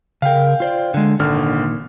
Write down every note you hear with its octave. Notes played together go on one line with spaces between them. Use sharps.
C#3 A#4 F5 G5
F4 C5 D5
D3 G#3
G#1 A#2 D3 D#3 F6